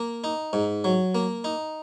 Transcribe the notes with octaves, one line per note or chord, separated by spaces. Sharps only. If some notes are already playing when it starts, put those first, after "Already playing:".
Already playing: A#3
D#4
G#2
F#3
A#3
D#4